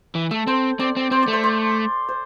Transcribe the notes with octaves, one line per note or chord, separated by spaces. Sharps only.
E3
A3 A4
C4 C5
C4 D5
C4
C4 C5
D5
A3
C5
C5
C5